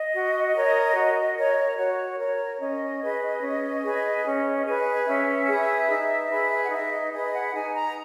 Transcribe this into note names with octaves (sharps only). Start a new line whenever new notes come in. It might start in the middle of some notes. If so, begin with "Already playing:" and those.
Already playing: D#5
F#4
A#4 C#5
F#4
A#4 C#5
F#4 C#5
A#4 C#5
C#4 D#5
G#4 B4
C#4
G#4 B4
C#4
G#4 B4
C#4 E5
G#4 B4
D#4
G#4 B4
F#5
D#4 E5
D#5
G#4 B4 D#5
F#5
D#4 G#5
A#5